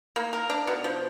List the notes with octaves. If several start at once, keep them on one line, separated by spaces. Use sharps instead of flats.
A#3
A#4
D4
B2
F3